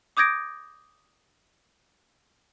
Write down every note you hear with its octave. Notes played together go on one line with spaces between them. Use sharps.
D6 D#6 G6 G#6 A#6 D7